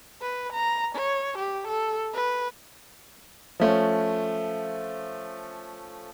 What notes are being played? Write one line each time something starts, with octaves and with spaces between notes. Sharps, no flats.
B4
A#5
C#5
G4
A4
B4
F3 A3 C#4